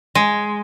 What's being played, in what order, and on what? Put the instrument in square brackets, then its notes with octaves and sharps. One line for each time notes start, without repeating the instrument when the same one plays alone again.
[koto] G#3